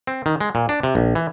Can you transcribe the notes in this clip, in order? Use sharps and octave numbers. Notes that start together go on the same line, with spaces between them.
C4
D#3
G#3
A#2
D4
C3
A#1
E3